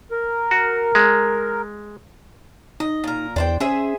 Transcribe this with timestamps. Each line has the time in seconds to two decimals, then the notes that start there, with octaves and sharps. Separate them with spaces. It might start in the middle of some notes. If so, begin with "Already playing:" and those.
0.11 A#4
0.51 F#4
0.95 G#3
2.80 D#4 D#5
3.04 A#2 A#4
3.36 E2 D4 C5 G5
3.60 C#4 G#4 C5 E5